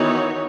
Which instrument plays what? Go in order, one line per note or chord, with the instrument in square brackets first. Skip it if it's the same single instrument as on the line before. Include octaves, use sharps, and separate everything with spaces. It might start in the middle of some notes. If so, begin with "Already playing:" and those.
Already playing: [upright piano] D#3 [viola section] E3 B3 D#4 F#4 C#5